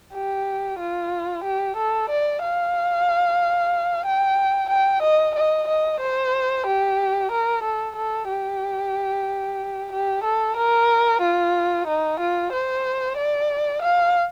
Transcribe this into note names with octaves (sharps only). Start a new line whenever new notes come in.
G4
F4
G4
A4
D5
F5
G5
G5
D#5
D#5
D#5
C5
G4
A#4
A4
A4
G4
G4
A4
A#4
F4
D#4
F4
C5
D5
F5